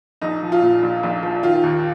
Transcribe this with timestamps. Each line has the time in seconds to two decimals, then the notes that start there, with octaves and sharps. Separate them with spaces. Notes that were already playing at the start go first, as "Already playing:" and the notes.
0.21 A#1 D#4
0.43 F3
0.52 F4
0.62 A#2
0.83 A#1
1.03 A#1
1.23 F3
1.43 D#3 F4
1.63 D#2